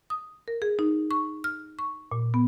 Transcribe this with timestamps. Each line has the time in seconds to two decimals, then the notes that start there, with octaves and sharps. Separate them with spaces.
0.10 D#6
0.48 A#4
0.62 G#4
0.79 D#4
1.11 C#6
1.44 F6
1.79 C#6
2.11 A#2
2.34 B3